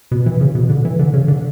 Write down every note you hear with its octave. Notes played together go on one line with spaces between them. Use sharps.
B2
E3
C#3
B2
D3
E3
D3
C#3
D3